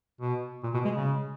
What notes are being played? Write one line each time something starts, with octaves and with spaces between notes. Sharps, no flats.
B2
A#2
B2
G#3
C#3